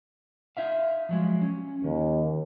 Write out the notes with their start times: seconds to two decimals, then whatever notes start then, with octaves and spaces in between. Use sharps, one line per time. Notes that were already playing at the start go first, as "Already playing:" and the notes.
0.57 D#4 E5 F5
1.09 F3 F#3 G#3
1.42 C#4
1.84 D#2 D#3